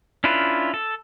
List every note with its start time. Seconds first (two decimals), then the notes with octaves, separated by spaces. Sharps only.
0.24 C#4 D4 E4 F4 B4
0.74 A4